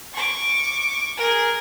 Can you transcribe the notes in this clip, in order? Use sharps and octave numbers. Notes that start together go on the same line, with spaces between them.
C#6 D6
G#4 A#4